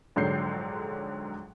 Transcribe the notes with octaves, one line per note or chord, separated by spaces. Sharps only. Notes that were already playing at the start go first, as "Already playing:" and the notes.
A#1 G#2 D3 F#3 G6 C7